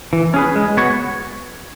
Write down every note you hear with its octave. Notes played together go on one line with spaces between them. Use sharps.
E3
C#4 G#4 B4
G#3
B3 F#4 C#5